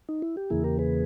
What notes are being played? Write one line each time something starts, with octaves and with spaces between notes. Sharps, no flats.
D#4
E4
G4
E2 C#3 E3 A#3 E4 G#4
G4 A#4
G#4 B4